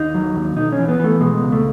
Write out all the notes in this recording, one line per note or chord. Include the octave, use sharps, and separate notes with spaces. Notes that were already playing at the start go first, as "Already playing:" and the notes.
Already playing: D#2 D#4
F#3
D#2
B1 D#4
C#4
E3
B3
E3 A3
B2 G#3
C#2
A3